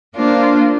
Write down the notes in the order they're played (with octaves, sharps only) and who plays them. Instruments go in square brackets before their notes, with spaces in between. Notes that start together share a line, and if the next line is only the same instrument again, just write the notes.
[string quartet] A#3 D4 F4 C5